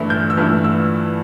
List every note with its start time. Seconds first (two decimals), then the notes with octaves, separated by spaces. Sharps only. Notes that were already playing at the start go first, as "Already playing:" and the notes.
Already playing: G2 E3 A3 E4 F6
0.10 G6
0.30 E6
0.37 G2 E3 A3 E4 F6
0.64 E6